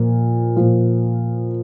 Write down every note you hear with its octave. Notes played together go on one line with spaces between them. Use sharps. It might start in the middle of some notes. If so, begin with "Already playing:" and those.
Already playing: A#2 F3
A#2 F3